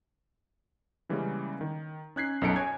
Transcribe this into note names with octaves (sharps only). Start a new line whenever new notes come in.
C#3 E3 G3 G#3 A#3 C#4
D#3
C#4 D#4 F#6 G#6 B6 C7
B1 F#2 D#4 A4 C#7 D7
C#5 G#5 G#6